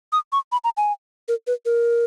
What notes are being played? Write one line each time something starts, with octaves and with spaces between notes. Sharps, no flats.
D#6
C#6
B5
A#5
G#5
A#4
B4
A#4